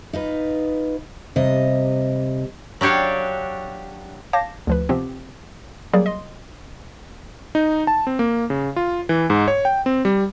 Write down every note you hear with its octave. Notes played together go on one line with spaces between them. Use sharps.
D#4 F4 B4
C3 G3 D#5
F#3 D4 G4 C#5 F5
C#5 F5 A5 D6 G6 A#6
D2 F3 B4
C3 F3 B3 C4 G4
F#3 G3 A#3 G#4 D5
D#5 C6
D#4
A5
C4
A#3
C#3
F4
E3
G#2
C#5
G5
C4
G3